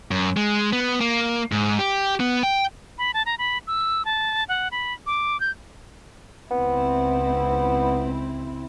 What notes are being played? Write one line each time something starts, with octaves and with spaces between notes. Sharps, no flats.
F#2
G#3
B3
A#3
G#2
G4
B3
G5
B5
A5
A#5
B5
E6
A5
F#5
B5
D6
G6
C#2 B3 C4 E4